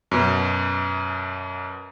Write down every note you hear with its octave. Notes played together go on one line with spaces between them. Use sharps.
F#2 B2